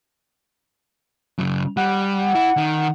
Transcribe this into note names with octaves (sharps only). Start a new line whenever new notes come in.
F#2 C#3
G3 F#5
E4
D#3